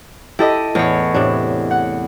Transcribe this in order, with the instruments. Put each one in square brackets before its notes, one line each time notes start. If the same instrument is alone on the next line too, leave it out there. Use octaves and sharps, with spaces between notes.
[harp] E4 A4 D#5 [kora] G4
[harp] E2 C#5 [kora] A2
[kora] A2 C3 D4
[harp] F#5